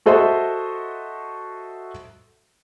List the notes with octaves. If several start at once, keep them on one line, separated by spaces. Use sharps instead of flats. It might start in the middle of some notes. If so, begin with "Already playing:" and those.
F#4 A4 C5 D#5 E5 C6